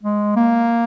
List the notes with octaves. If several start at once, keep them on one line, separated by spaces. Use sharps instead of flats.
G#3
A#3